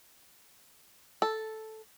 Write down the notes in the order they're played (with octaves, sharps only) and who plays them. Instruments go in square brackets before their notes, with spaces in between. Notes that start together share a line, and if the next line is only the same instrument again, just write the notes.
[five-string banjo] A4